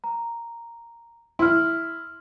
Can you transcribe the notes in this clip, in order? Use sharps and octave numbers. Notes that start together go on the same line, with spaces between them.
A#5
E4 C6 F6